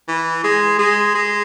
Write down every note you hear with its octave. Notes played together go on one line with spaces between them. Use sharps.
E3
G#3
G#3
G#3